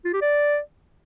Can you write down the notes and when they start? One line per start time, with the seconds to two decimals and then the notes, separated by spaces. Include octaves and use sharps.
0.05 F4
0.13 G4
0.22 D5